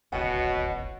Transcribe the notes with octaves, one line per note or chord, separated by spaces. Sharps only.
D1 G#1 C#2 B2 F#4 C#5 D#5